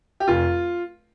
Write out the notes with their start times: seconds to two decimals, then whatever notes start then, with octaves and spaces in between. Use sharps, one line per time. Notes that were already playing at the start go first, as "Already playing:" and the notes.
0.20 G4
0.27 F1 F4